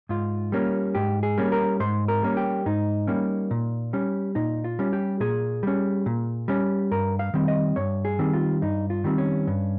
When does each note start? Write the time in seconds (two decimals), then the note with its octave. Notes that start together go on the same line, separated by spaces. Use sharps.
0.09 G#2 F4
0.52 G3 A#3 C#4
0.95 G#2 G4
1.23 G#4
1.38 G3 A#3 C#4
1.52 A#4
1.80 G#2 C5
2.08 A#4
2.22 G3 A#3 C#4
2.37 G4
2.66 G#2 D#4
3.07 G3 A#3 C#4
3.51 A#2
3.93 G3 C#4
4.35 A#2 D#4
4.64 F4
4.79 G3 C#4
4.93 G4
5.20 A#2 G#4
5.63 G3 C#4
6.06 A#2
6.48 G3 C#4
6.91 G2 A#4
7.19 F5
7.34 D#3 G3 C4
7.48 D#5
7.76 G2 C#5
8.05 G#4
8.19 D#3 G3 C4
8.33 F4
8.62 G2 D#4
8.90 F4
9.04 D#3 G3 C4
9.18 C#4
9.47 G2